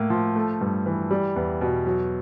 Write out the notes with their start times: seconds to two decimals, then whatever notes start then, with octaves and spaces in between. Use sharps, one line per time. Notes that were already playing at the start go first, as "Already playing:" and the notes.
Already playing: A2 A#3
0.10 F3
0.36 A3
0.61 G2
0.86 E3
1.11 G3
1.36 E2
1.61 B2
1.86 F#3